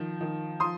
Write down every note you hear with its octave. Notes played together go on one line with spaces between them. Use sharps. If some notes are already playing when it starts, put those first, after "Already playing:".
Already playing: D#3 F3
D#3
F3 C6 D#6